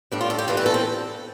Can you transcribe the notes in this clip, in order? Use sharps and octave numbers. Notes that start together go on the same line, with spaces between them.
A2 G3 D4
F4
A4
G4
A2 E3 G3 F4
B4
A4
C4